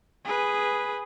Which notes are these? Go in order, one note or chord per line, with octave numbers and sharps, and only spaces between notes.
G#4 B4